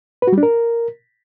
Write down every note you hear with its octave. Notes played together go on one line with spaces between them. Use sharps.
B4
F#4
G3
D4
A#4